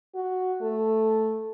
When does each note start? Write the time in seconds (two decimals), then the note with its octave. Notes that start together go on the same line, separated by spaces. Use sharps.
0.15 F#4
0.61 A3